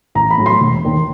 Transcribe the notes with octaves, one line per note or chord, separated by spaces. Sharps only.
A1 A#5
B5
A2 F#3
C6
E1
D#2 D#3